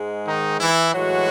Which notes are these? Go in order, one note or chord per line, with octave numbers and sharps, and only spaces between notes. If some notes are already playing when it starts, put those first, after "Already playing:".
Already playing: G#2 G#3
D#3 D#4
E3 E4
A2 E3 F#3 G#3 F#4